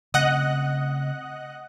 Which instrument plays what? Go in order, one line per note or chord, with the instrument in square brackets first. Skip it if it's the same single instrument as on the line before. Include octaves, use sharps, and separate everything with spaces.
[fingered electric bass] C#3 A3 C4 [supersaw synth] D#5 F#5 F#6